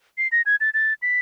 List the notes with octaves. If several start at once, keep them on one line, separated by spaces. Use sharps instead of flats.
C7
A#6
G#6
A6
A6
B6